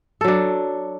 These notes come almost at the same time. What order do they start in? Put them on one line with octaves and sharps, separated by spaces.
A4 F#3 D4